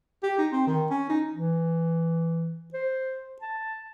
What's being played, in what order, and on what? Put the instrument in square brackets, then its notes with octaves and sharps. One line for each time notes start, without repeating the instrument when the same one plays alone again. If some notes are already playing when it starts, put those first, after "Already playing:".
[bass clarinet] G4
D#4
C4
D#3
C#4
D#4
[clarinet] E3
C5
A5